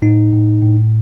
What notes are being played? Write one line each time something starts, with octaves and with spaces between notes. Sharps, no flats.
A2 D#4
A2
A2